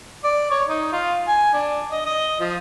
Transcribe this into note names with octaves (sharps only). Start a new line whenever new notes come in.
D5
C#5
D#4
F4
G#5
D4
D#5
D#5
F3